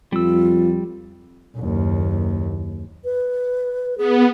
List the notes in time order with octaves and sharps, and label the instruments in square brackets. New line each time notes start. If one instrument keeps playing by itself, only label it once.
[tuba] F2 [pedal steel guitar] G3 E6 [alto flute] F4
[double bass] F#1 D#2
[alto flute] B4
[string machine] B3 [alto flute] G#4